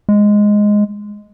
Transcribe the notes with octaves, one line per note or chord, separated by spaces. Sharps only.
G#3